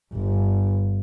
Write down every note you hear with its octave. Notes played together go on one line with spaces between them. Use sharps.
G1